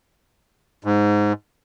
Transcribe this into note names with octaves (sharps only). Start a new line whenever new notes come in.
G#2